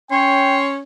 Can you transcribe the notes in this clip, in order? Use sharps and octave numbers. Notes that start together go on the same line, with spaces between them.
C#4 C#5 G5 C6